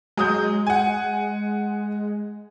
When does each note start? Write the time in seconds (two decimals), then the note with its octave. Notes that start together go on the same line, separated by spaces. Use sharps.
0.17 F#3 G#3 D#6 G6
0.67 F#5 G#5